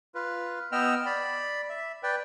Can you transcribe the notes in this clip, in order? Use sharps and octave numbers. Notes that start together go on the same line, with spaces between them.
F4 B4
B3 D#5 G5 E6 F6
D5 B5
E5
B4 D5 G5